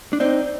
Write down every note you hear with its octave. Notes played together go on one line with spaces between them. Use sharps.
D4
C4 D#4 D5